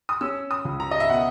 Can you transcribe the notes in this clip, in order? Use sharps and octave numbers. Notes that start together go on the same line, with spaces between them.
D#6
C#4 E6
D#6
C#2
A#5
D#5
E5
B2 F#5